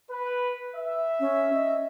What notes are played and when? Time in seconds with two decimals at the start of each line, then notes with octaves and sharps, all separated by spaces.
0.10 B4
0.76 E5
1.20 C#4
1.53 D#5